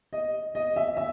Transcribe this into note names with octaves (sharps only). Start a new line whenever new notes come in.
D#5
D#5
E5
E5